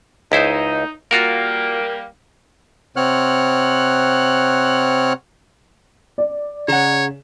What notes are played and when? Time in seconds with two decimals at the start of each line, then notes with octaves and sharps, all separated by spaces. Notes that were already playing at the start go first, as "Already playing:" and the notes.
0.32 C#2 D#4 E4 C5
1.11 G3 A#3 F4 F#4 A#4
2.96 C3 C4 C#5 F#5 F6 F#6
6.18 D5
6.68 C#3 C#5 F#5 A#5 E7